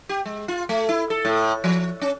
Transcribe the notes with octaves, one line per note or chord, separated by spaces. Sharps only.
G4
G#3
F4
A3
E4
A4
A2
F3
C#4